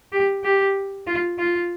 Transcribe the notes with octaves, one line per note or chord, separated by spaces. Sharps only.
G4
G4
F4
F4